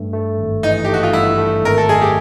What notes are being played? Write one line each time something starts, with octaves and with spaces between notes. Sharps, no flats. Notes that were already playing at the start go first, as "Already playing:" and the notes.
Already playing: G2 A3
A3
G#1
E3 D#4
A3 G4
F#4
F4
G2 E4
A3
G#1 A#4
A4
F#2 G#4
G4